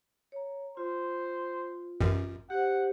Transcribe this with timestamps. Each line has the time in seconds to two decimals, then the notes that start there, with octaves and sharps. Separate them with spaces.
0.32 C#5 A#5
0.77 F4 C5
2.01 A1 F#2
2.50 G4 C5 F#5